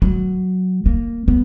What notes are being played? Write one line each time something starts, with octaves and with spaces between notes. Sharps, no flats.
F#3
A#3
B3